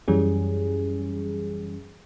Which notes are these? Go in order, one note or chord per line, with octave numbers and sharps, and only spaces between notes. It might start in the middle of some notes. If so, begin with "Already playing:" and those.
F#2 E3 G3 C#4 G#4